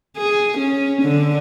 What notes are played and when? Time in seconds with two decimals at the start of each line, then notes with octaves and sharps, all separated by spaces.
0.17 G#4
0.58 C#4
1.02 D3